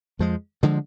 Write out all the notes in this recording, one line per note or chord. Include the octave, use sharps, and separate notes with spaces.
F2 F3 G#3
D3 F3 G#3